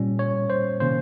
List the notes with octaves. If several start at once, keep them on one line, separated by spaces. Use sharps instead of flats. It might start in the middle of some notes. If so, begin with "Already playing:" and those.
Already playing: A#2 G3 C#4
C#5
C5
C3 D#3 A#3 C#4 C5